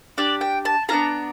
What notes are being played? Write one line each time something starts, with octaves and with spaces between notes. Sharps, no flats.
D4 G4 D5
G5
A5
B3 D4 F4 G#4 A#5